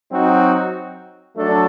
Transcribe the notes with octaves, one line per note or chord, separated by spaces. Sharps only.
F#3 C4 D#4 F#4
F#3 A3 D4 A4